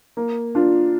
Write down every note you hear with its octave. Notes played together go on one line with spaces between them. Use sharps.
A#3
D4 F4